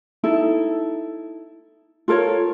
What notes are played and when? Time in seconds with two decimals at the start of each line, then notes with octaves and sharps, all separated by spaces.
0.24 D#4 E4 A4
2.08 F4 A4 A#4 C#5